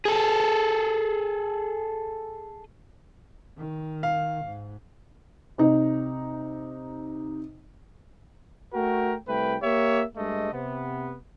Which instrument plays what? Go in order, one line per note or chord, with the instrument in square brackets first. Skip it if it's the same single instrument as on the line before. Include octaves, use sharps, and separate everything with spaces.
[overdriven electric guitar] G#4 A4
[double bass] D#3
[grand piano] F5
[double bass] G#2
[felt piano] C3 D#4
[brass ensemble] A3 F#4 A#4 G5
C2 A3 B4 G5
A#3 G4 C#5 E5
G2 G#3 A3 D#5
C3 B3